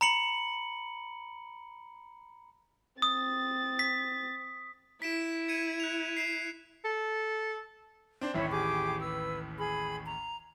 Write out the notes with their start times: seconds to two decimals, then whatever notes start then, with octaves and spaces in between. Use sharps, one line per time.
0.01 A#5 B5 C#7 F#7
3.02 C4 D#6 A6
3.79 B6
5.02 E4 B6 D7 E7
5.48 G#6 C#7 D#7
5.80 F#6 F7
6.17 C7 D7 E7
6.84 A4
8.21 C4 D4 C5
8.34 A1 D#2 A2 E4 C#5 E5
8.52 G4 G#4 D6
9.01 B4 E6
9.58 G#4 B5
10.06 A#5